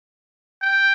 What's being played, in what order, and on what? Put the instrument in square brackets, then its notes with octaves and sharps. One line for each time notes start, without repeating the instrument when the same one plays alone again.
[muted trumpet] G5